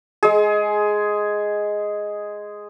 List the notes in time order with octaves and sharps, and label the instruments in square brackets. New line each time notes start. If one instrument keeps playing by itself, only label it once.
[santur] G#3 G#4